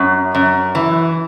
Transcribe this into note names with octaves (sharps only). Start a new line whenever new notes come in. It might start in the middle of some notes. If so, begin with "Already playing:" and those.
Already playing: F#2
F#2
E3